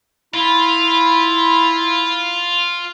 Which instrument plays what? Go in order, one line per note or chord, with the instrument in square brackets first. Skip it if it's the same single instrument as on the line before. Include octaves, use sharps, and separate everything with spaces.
[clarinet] E4 [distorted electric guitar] F4 [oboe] B5